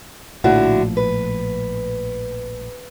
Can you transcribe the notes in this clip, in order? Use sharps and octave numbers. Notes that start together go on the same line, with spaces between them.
A#1 A2 D3 F3 E4 F#4
B4